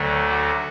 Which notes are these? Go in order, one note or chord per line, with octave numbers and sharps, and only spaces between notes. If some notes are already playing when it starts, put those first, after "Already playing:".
Already playing: D2 D3 F#3 A3
F#4